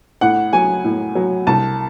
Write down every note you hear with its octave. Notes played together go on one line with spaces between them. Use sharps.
A2 F#5
F#3 G#5
A2
F#3
C2 A5